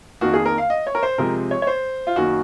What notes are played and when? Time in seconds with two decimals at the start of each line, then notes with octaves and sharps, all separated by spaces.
0.21 F2 D#3 A#3 F#4
0.33 G#4
0.45 A#4
0.58 F5
0.70 D#5
0.87 C#5
0.95 A#4
1.03 C5
1.18 C3 F3 G#3 C4 A#4
1.51 C#5
1.62 C#5
1.67 C5
2.07 F4
2.16 F#2 D#3 A#3 F#4